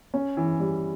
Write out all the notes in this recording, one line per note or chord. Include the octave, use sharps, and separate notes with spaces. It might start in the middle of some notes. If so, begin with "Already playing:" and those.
C#4
E3
G3